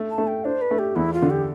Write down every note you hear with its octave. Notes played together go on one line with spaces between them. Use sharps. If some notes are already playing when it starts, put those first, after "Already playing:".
Already playing: A3
A5
A3
G5
D4 C5
B4
A3
G4
E2 E4
F4
D3
G4